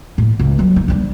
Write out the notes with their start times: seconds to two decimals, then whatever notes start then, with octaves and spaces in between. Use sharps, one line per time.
0.18 A2
0.39 C#2
0.58 F#3 G3
0.76 D#4
0.88 G3 D4